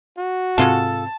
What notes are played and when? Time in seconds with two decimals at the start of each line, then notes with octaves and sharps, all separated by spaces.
0.17 F#4
0.58 G#2 C3 G#3 C4 F4 A4 A5